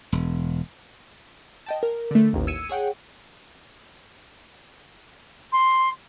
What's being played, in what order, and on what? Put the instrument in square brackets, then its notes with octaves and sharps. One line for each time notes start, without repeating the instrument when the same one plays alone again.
[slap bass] E1
[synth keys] D#5 G5 A5
A#4
D3 A3
A1 D#2
E6 G#6 C#7 D#7 E7
G#4 C#5 F#5 G5
[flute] C6